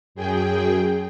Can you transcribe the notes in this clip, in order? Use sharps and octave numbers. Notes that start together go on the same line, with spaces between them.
F#2 G#4 G5